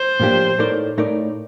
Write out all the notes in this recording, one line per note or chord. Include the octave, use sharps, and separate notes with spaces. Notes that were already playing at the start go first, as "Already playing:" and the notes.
Already playing: C5
A2 F3 A#3 D4 G4
A2 A3 D#4 A#4 D5
A2 A3 D#4 A#4 D5